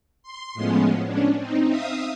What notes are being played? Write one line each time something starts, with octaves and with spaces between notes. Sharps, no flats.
C6
A2 F3 G#3 B3 C#4
C#4 D4
C4 D#4
E5 F5 D#6